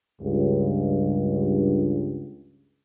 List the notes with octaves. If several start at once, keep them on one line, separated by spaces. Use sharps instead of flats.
C#2 G2